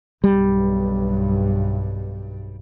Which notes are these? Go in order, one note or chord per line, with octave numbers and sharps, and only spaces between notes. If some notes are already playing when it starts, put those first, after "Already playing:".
B1 G2 G3